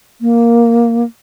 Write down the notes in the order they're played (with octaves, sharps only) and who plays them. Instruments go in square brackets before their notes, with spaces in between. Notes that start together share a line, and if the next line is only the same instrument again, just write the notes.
[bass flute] A#3